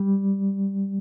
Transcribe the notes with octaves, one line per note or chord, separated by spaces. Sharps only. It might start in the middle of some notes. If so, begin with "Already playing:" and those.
Already playing: G3